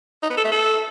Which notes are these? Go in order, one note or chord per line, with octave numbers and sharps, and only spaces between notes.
D#4
B3
A4
A3
A4